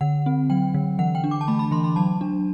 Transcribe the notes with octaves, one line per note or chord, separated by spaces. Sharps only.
D3 F#5
C4
F#3 G5
D3
E3 F#5
G5
D4
D6
A5
A3 B5
B5
E3 C6
B5
F#3 A5
D4